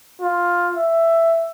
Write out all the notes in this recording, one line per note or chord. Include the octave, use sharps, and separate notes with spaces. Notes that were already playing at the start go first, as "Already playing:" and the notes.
F4
E5